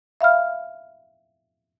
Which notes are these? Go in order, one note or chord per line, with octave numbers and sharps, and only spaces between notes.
E5 F5 B5 F6